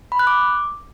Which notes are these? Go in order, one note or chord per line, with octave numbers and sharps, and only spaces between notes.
B5
F#6
D6